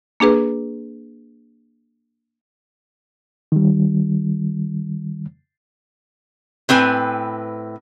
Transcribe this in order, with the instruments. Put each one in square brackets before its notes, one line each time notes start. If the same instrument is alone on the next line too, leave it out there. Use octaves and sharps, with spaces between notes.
[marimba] A#3 D4 G#4 B4
[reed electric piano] D#3 G3
[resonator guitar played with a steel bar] A2 C4 B4 G#5